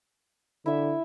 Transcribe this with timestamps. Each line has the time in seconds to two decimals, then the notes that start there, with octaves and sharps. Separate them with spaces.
0.66 D3 E4 E5